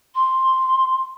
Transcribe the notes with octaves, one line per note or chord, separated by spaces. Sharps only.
C6